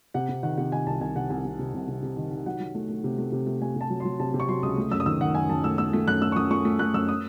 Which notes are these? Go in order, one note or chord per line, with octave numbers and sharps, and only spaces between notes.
C3 F#5
C3
D#3 F#5
C3 F#5
D#3 G#5
C2 A5
C2 G#5
C3 F#5
C2 G#5
C3
C3
C2
C3
C3
D#3
D#3
F#3 F#5
F#3
A3
A3
C3
A3
C3
A3
A3 G#5
C3 A5
F#3
F#3 C6
C3 A5
C3
C#6
F#3 C6
C#2 D#6
A3
F#2 E6
D#6
D#3 E6
D#3 F#5
F#2 G#5
F#2 A5
A3 E6
A3 E6
A3
F#2 F#6
A3 E6
C#6
F#2 D#6
A3 C#6
A3
A3 F#6
F#2 E6
D#6